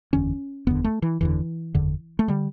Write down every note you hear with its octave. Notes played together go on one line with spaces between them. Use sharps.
F#1 E2 D3 C#4
F#1 E2 D3 B3
A3
E3
F#1 E2 D3 E3
F#1 E2 D3
A3
D3 G3